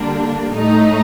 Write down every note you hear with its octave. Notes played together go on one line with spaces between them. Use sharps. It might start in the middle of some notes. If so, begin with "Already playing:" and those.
Already playing: D3 G3 A#3 D4
A2 A3 D#4